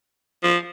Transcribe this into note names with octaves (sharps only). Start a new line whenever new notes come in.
F3